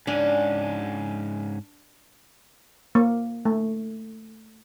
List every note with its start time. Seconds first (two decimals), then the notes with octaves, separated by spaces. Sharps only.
0.07 G#2 C#4 D4
2.95 A#3
3.45 A3